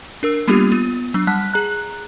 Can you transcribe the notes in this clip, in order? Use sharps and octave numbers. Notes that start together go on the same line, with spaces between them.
D4 A#4 E6
G3 A#3 B3 D4 F4 G4
B3 F4
F#3 D4
G3 F#5 A5 F#6 B6
G#4 A#5 F#6